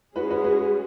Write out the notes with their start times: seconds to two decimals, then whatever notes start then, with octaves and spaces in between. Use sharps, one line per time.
0.16 G#3 C#4 F#4 G#4 B4
0.30 F#4 B4
0.44 F#4 B4